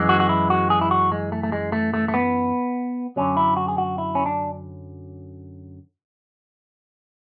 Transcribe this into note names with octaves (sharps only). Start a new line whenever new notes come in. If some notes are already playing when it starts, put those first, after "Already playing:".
Already playing: F#2 E3 G#3
F#4
F#4
E4
F#4
G#4
E4
F#4
G#3
A3
A3
G#3
A3
A3
A3
B3
F#2 D3 F#3 C#4
E4
F#4
G#4
F#4
E4
C#4
D4